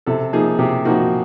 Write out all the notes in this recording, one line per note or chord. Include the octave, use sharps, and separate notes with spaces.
C3 A4
F3 A#3 D#4 G#4
C3 G4
F3 A#3 D#4 F#4